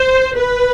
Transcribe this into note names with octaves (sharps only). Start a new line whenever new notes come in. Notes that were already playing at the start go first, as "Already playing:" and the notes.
Already playing: C5
B4